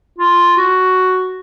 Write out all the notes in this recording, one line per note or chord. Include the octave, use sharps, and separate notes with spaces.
F4
F#4